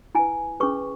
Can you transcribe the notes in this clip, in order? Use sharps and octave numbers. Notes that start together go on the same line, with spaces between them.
E4 B4 G#5
C#4 G#4 B4 C#6